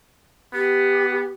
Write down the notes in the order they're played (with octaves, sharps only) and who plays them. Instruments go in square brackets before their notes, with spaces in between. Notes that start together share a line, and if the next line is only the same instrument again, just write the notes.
[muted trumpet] B3 [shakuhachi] G4